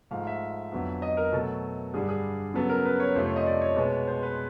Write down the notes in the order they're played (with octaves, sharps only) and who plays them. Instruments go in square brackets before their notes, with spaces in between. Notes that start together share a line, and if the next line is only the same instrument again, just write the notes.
[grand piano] G#2 F3 A3 F5
E5
F2 D3 F#3 B3
D#5
A#4
B2 F#3 A3 A4
G2 D3 G3 G#4
G#4
C#3 F#3 B3 A4
A#4
B4
C#5
F2 C3 F3 A3 C5
C#5
D#5
D5
C#5
B2 G#3 B3
C5
B4